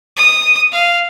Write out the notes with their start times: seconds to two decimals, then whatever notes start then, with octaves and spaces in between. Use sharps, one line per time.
0.16 D#6
0.72 F5